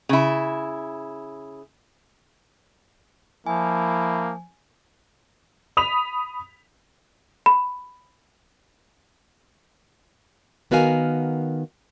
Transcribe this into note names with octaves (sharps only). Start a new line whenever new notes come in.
C#3 E4
F3 A#3 E4 G#5
B5 D#6 B6 F7
B5
D#3 B3 F#4 A#4 F5 G#5